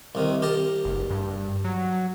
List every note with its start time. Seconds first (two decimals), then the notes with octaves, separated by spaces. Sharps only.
0.15 C2 C3 D#3
0.42 G4 A#4 A5
0.85 F#1
1.10 G2
1.64 F#3